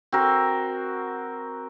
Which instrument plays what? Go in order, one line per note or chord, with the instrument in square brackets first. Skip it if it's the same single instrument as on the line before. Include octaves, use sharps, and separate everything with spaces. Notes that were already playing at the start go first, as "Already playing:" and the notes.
[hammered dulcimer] C4 F#4 A#4